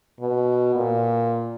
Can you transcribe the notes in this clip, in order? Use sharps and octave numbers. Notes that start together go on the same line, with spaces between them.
B2
A#2